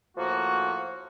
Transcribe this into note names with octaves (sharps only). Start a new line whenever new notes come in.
A2 F3 A#3 F#4